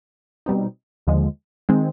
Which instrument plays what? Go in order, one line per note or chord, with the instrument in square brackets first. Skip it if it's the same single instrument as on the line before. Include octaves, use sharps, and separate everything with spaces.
[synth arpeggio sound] B2 G3 C4 D#4
D#2 D3 F3 G#3
D#3 G#3 C4